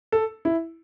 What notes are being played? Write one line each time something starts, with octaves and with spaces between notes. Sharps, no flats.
A4
E4